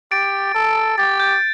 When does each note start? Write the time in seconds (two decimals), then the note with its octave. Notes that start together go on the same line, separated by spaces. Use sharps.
0.11 G4 A6 D7
0.54 A4
0.97 G4 A6
1.20 G6